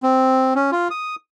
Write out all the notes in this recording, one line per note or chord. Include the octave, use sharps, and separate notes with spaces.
C4
C#4
F4
D#6